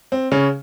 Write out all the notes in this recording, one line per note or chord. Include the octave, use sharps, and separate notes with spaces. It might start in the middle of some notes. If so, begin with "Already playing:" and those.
C4
C#3 C#4